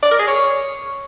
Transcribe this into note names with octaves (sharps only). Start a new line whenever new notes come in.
D5
A#4
G#4
C#5